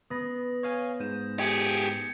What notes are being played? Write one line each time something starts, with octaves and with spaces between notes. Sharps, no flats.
B3 D#6 A#6
C#5 F5 G#5
G#2 G6 D#7 E7
G4 G#4 G#6 C#7 E7